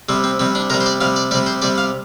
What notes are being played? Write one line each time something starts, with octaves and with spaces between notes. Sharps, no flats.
C3 G3 C4
C4
C3 G3 C4
D4
C3 G3 A#4
C5
D5
C3 G3 F5
D5
C3 G3 D5
C5
C3 G3 D5
F5